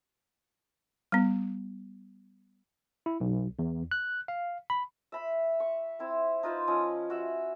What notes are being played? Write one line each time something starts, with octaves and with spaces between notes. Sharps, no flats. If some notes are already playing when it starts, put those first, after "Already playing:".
G3 B3
E4
B1
E2
F#6
F5
B5
E5 B5
C#6
C4 E4
D#4 F4 B4 C5
F3 C#4 D#5 E6
F#4 E5